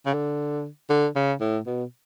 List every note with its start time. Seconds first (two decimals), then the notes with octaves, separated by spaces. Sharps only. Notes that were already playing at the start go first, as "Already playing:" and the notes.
0.06 C#3
0.13 D3
0.89 D3
1.15 C#3
1.40 A2
1.66 B2